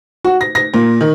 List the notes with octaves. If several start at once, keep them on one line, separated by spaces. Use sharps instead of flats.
F#4
A#6
A#6
A#2
D#3